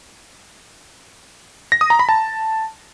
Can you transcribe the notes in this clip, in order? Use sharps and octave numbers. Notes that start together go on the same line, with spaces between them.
A#6
D#6
A#5
B5
A5